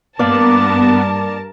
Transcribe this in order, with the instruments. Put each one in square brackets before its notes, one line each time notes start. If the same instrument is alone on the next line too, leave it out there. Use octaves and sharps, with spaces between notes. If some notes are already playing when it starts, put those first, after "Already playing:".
[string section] G2 A#4 A5 [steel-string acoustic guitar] A#3 D5 [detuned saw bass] B3